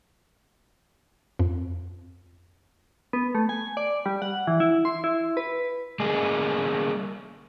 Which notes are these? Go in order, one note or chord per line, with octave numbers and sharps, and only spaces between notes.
F2
B3
A3
G#5
D5
G3
F#5
E3
E4
C6
E4
B4
G3 A#3 G#4